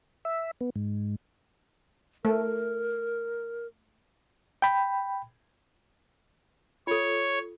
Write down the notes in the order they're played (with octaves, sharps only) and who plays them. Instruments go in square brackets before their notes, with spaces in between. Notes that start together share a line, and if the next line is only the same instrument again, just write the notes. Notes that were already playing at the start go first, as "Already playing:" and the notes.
[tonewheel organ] E5
B3
G#2
[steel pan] A3 [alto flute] A#4
[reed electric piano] G5 B5
[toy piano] F4 A4 [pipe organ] C#5